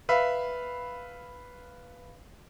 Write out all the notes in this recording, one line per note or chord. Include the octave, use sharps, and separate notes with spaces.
B4 E5 F5 B5